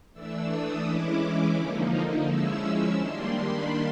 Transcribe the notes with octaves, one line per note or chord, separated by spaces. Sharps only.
E3 A3 D4 E6
D#6
E3 G#3 C#4 E4 D6
D3 F3 A#3 D#4
F3 G#3 C#4 E4 E6
D#3 G3 A#3 D4 C6
B5